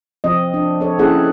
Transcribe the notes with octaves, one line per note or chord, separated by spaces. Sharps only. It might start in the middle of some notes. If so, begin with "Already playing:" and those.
F3 C4 D#5
D4
C4 A4 C#5
A#3 C#4 E4 G#4 A4 F#5